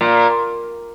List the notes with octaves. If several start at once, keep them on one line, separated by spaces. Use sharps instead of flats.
A#2